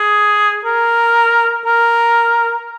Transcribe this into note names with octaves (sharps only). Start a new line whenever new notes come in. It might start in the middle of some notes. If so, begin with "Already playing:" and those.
Already playing: G#4
A#4
A#4